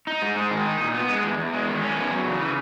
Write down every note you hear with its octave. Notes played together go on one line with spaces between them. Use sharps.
D#4
G#2
G#3
D#3
D#4
A#2
B3
G#3
E2
E2
G#3
D#3
C#4
E2
F#3
C#3
E3